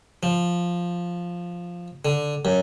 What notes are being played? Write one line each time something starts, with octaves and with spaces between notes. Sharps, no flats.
F3
D3
F#2